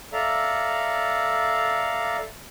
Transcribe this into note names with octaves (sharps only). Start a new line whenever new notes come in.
A4 D5 E5 F5 A#5